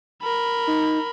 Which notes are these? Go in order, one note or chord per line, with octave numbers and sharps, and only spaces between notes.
A#4 B5
D#4